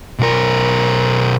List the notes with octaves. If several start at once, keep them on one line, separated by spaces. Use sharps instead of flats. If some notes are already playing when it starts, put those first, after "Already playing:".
B1 A#4